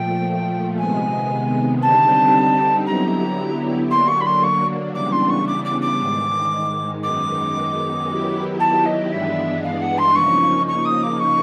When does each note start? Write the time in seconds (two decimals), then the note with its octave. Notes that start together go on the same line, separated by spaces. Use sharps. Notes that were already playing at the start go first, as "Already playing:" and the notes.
Already playing: A#2 F3 A3 G5
0.77 C3 D#3 G#3 B3 G#5
1.81 D3 G3 C4 D#4 G4 A5
2.86 D3 F#3 B3 E4 G4 A#5
3.90 D3 F#3 A#3 D4 C6
4.07 C#6
4.20 B5
4.25 C6
4.42 C#6
4.94 C#3 E3 G3 B3 D4 D6
5.12 C6
5.29 C#6
5.47 D6
5.64 D6
5.81 D6
5.98 G#2 D#3 G#3
7.02 F#2 D#3 G#3 B3 D#4 D6
8.07 D#3 F#3 B3 E4 G4
8.59 A5
8.85 D#5
9.11 G2 E3 G#3 B3 D4 E5
9.63 F5
9.81 F#5
9.97 C6
10.15 C#3 F3 A#3 D#4 C#6
10.67 C#6
10.85 D#6
11.02 D6
11.19 C#6